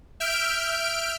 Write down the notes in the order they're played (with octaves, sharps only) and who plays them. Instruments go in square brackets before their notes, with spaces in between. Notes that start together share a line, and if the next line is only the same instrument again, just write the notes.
[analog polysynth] E5 F6 G6 D7